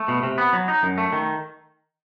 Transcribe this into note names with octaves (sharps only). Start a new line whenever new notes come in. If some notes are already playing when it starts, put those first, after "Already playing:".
Already playing: A3
B2
C3
B3
F#3
D#4
F#2
A3
D#3